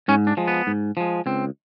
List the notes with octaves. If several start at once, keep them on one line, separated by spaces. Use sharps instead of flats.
G#2 C#4
D4
F3 G#3
B3
G#2
F3 G#3
C#2 C4